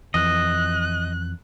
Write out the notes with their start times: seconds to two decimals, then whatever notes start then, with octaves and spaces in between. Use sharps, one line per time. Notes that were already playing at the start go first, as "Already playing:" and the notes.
0.14 F2 E3 D#5 F#6